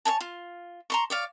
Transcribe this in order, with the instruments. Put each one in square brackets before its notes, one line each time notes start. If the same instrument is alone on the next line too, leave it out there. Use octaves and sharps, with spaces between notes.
[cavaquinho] C#5 E5 G#5 A5
F4
A#5 C6 C#6
C#5 D5 F5